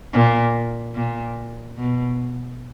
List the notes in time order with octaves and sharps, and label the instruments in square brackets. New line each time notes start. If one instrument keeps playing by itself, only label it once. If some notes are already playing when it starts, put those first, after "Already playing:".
[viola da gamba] A#2
A#2
B2